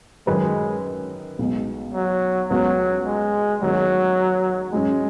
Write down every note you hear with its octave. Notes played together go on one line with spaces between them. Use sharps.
F#2 D#3 F#3 G#3 D#4 B4
B1 B2 G#3
F#3
C#2 B2 F#3 B3 F#4 C#5
G#3
G#2 D#3 F#3 B3 D#4 G#4
G#2 F#3 G#3 C#4